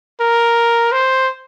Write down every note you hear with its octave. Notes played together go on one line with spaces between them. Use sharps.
A#4
C5